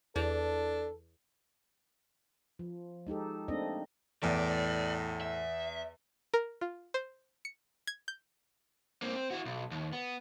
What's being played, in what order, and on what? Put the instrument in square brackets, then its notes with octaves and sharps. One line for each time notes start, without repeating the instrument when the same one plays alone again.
[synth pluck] E2 [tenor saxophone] D4 [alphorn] A4
[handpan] F3
G#3 D#4 G4 A4
A3 A#3 C4 D4 D#4 D#5
[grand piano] E2 [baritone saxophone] A2 [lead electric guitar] D5
[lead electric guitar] E5
[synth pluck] A#4
F4
C5
C#7
G#6
G6
[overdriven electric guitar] A#3 C4
C4
E4 F#4
B1
D#2
B3